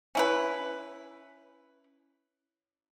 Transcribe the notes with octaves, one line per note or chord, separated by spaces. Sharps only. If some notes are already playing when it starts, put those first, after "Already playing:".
C#4 E4 B4